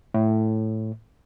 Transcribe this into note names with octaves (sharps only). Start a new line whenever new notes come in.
A2